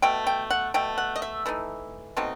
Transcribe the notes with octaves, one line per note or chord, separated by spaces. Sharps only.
B2 A3 G5
G5
F#5
B2 A3 G5
F#5
D#5
E5
E3 A3 D#4
B2 A3 C4 D#4